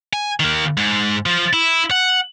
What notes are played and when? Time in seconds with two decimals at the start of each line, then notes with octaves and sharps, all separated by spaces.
0.13 G#5
0.40 D#3 A#3
0.77 G#2
1.26 F3
1.53 E4
1.91 F#5